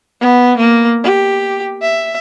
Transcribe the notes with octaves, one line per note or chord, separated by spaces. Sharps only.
B3
A#3
G4
E5